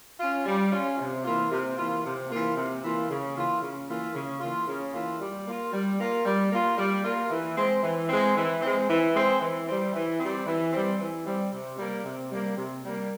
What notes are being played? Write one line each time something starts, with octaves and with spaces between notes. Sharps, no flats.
C#4 F4
G3
C#4 F4
C3
E3 A#3 F4
C3
E3 A#3 F4
C3
E3 A#3 F4
C3
E3 A#3 F4
C#3
E3 A#3 F4
C#3
E3 A#3 F4
C#3
E3 A#3 F4
C#3
E3 A#3 F4
G3
A#3 F4
G3
A#3 F4
G3
A#3 F4
G3
A#3 F4
E3
G#3 C4
E3
G#3 C4
E3
G#3 C4
E3
G#3 C4
E3
G3 C4
E3
G3 C4
E3
G3 C4
E3
G3 C4
C3
G3 A#3
C3
G3 A#3
C3
G3 A#3